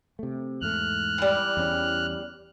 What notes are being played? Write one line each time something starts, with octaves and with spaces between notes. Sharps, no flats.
C3 A3
E2 G#2 A3 F6 F#6
E3 G3
E2 C#4